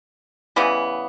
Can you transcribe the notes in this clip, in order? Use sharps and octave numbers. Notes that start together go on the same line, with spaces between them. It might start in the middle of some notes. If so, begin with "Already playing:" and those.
C#3 E3 G3 B3